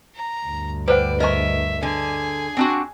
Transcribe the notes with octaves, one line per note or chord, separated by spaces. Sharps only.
A#5
D2 G2
G3 B4 C5 D5 F#5
A#4 D#5 E5 G#5 C#6
D3 G#4 G#5
C4 D4 F#4